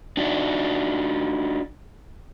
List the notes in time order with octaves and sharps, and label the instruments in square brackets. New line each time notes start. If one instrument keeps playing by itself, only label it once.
[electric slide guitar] D4 D#4 F#4